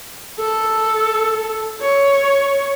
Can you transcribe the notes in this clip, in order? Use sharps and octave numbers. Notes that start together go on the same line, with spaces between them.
A4
C#5